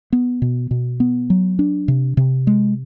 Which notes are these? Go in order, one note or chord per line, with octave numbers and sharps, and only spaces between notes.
B3
B2
B2
B3
F#3
D4
C3
C3
G#3